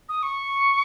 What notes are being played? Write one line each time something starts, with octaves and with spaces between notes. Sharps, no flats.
D#6
C#6